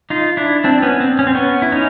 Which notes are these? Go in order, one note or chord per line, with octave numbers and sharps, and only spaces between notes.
D#4 F4
D4 E4
C4 D4
B3 C#4
C4
C#4
C4
B3 C#4
E4
C#4 D#4